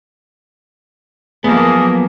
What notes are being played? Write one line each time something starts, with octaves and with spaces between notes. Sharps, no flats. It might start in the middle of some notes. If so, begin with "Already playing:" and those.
F3 F#3 A#3 B3 G#4